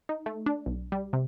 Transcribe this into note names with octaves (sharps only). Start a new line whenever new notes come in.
D#4
A3
D4
B1
G3
C3